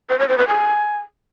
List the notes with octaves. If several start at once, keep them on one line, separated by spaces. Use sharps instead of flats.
C5
C#5
C5
B4
G#5